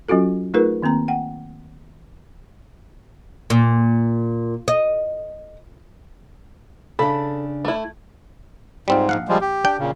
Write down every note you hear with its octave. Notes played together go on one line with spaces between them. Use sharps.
F#3 C#4 F4 F#4 A4
A3 D#4 F4 G#4 A#4 B4
D#3 A#3 C4 A#5
F#5 G5
A#2
D#5
C#3 D4 A4 B5
A3 E4
G#2 G3 C4 F4
A#1 F5 F#5
F3 G3 G#3
G4
D4 G5
A#2 C#3